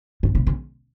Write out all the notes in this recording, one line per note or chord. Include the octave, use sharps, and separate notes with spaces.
G#2
C3
C#3